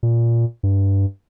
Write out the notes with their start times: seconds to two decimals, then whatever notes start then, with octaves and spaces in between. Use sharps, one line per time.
0.03 A#2
0.63 G2